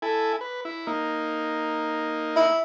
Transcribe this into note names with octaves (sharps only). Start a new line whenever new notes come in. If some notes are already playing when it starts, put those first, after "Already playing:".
E4 A4 G#5
B4
E4
A#3 D#4
E4